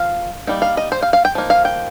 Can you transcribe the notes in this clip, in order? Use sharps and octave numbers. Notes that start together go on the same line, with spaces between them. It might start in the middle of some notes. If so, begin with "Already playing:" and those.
Already playing: F3 F5
G3 A#3 D#4
F5
D#5
C5
F5
F5
G5
F3 A#3 D#4
F5
G5